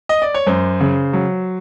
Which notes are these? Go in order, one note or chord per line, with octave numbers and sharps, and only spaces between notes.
D#5
D5
C#5
F#2 C5
C#3
F#3